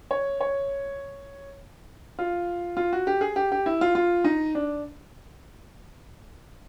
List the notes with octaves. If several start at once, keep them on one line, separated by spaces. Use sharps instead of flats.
C#5
C#5
F4
F4
F#4
G4
G#4
G4
G4
E4
F4
F4
D#4
D4